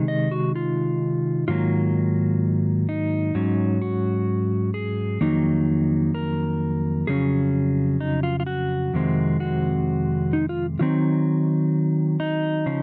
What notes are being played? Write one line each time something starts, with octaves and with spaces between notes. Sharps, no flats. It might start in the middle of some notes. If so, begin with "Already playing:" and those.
Already playing: C3 D#3 G#3 D#4
D#5
F#4
F4
G#2 D#3 F#3 A#3 F4
D#4
G#2 F#3 C#4
F#4
G#4
F2 D#3 F#3 A#3 D#4
A#4
F2 C#3 F#3 C#4 G#4
D#4
F4
F4
F#4
F2 C3 D#3 G#3 C4
F#4
D#4
F4
D#3 F#3 C4 D#4 F4
D#4
C#3 F3